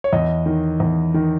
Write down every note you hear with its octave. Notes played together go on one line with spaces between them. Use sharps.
C#5
E2 D#5
D#3
E2
D#3